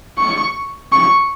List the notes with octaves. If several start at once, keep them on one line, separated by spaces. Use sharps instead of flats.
C#6
C#6